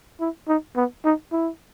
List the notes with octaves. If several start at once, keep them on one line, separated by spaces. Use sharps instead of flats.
E4
D#4
B3
D#4
E4